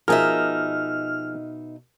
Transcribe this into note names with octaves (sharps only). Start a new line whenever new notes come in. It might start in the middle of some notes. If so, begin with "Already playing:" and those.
B2 F3 D#4 G#4 A#4 E5 F6